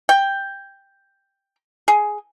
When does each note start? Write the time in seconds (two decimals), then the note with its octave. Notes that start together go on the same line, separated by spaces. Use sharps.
0.09 G5
1.88 G#4